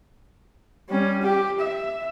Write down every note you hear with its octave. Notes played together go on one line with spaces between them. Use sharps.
G3 C#4
G4
E5